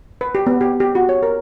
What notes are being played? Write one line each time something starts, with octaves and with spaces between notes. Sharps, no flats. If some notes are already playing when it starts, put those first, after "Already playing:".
B4
G4
B3
G4
G4
F#4
C#5
A#4